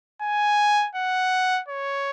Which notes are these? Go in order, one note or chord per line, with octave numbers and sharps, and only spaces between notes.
G#5
F#5
C#5